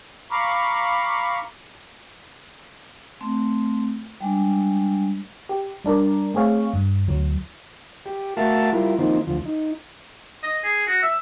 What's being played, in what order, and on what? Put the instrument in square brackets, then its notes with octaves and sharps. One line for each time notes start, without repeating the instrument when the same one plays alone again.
[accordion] F5 A#5 B5 C#6 D6
[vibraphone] A3 C4
G3 G#3 D4
[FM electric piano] G4
G3 D4 A#4 D5
A3 C4 G#4 C#5 F5
G2
D2 F#3
[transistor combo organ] G4
A3 F#4 A#4 E5 F5 A5
G3 E4 F4 A#4
D#3 F3 A#3 C4 D#4
D2 F3
D#4
[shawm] D#5
G#4
F#4
E5